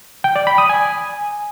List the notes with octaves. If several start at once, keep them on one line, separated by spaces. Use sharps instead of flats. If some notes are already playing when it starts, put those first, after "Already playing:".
G5
D5
B5
D#6
G#5